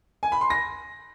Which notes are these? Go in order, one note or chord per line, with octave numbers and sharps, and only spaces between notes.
G#5
B5
C6
A#6